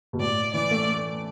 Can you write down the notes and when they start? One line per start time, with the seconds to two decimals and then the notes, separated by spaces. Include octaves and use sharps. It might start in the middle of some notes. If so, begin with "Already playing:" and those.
0.13 B2
0.19 A2 D5
0.54 E3 D5
0.71 A3